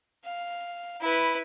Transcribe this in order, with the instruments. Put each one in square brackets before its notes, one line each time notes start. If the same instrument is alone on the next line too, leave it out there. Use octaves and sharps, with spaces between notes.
[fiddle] F5
E4 B4